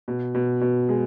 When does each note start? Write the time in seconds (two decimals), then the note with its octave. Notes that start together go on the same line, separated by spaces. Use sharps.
0.08 B2
0.35 B2
0.61 B2
0.89 G#3